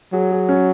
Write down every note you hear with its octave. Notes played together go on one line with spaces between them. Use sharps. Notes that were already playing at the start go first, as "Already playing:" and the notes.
F#3 G#4
G#4
C#4